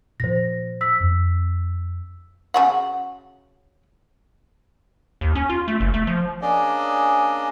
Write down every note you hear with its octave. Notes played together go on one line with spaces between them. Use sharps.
A#2 F3 C5 A#6
E6 B6
F2
C#3 F#4 F#5
D#2
C#4
F4
A3
F#1
A3
F3
A#3 C#4 D4 G#4 D5 D#5